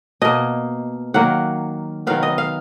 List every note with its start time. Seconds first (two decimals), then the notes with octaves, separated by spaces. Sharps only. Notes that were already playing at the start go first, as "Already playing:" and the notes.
0.22 B2 A#3 D#5
1.14 D#3 F#3 A#3 F#5
2.07 D#3 F#3 B3 F5
2.23 D#5
2.38 F5